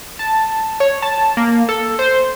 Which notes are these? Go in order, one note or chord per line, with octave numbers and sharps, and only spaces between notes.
A5
C#5
A5
A#3
A4
C5